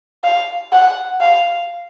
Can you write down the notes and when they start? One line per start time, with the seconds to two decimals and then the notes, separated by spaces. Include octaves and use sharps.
0.24 F5
0.73 F#5
1.21 F5